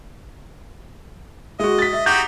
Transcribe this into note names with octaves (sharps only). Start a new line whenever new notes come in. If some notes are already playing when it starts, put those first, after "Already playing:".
G#3 F#4 D#5
A6 B6
E5
D#4 F#4 G4 G6